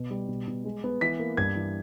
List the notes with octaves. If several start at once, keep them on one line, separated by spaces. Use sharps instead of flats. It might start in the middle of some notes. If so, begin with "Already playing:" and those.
Already playing: B2
G3
B2
B2
G#3
B3
E3 B6
A#3
G2 G#6
E3